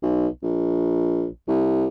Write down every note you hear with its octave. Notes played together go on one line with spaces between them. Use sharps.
B1
A#1
C2